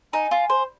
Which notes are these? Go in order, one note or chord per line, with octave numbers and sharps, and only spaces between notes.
D#4 G#5
F4
C5